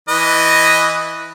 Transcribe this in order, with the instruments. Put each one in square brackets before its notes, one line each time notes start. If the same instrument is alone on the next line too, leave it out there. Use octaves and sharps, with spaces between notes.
[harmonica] E3 B4 D#5